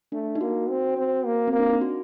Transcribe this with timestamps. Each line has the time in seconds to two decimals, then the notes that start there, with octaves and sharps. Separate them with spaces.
0.12 A3 D4
0.35 D#4
0.41 A#3 F#4
0.69 C4
0.97 C4
1.26 A#3
1.47 C4
1.53 A#3
1.59 D4
1.70 D#4
1.81 F#4